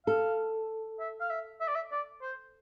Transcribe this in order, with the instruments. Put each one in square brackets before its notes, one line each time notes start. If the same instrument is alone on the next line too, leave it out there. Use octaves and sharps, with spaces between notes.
[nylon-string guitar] A4 [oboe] F5
[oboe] E5
F5
E5
E5
D5
E5
D5
C5